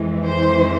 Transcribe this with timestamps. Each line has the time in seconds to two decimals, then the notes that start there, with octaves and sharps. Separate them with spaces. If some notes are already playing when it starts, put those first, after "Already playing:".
Already playing: F2 E3 G#3
0.25 C5